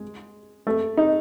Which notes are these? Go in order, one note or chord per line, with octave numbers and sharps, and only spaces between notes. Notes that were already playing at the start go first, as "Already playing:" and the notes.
Already playing: G#3
A3
D#4